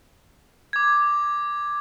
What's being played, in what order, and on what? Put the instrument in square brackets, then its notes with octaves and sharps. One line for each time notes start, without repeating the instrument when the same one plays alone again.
[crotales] D6 G#6